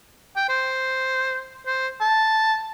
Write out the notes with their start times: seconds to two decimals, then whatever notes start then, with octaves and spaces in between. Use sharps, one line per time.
0.36 G5
0.49 C5
1.67 C5
2.01 A5